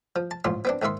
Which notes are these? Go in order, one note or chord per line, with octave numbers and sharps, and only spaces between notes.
F3
A5
A1 G#2 C#4 F4 C6
B3 C4 D4
D#2 G#2 D#3 E5 C6